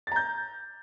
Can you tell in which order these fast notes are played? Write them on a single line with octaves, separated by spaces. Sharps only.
A6 A#5 G6